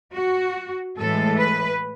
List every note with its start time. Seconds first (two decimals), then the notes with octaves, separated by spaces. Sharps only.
0.13 F#4
0.98 A2 E3 G#3 A4
1.39 B4